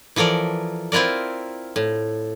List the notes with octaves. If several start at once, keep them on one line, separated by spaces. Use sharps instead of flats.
E3 F3 A4 A#4 D5
C4 E4 F4 A#4 D5
A2